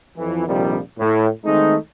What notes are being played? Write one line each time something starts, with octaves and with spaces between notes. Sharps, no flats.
F2 E3
A#1 F2 C3 D#3 F3 G3
A2
D#3 G#3 A3 C4 D#4